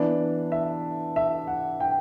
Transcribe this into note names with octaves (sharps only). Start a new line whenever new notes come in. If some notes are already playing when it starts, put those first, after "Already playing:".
Already playing: E3 B3 D4 D5
E5
E5
F#5
G5